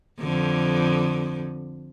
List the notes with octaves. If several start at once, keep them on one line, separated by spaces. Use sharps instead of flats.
F2 D3